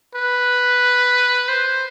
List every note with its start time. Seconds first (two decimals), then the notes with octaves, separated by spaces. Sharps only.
0.15 B4
1.49 C5